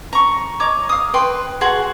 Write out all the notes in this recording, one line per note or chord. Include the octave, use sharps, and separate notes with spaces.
A#5 C#6
C#5 D#5 A#5 D6
F5 D#6
B4 G5 C6
F#4 G#4 F#5 C6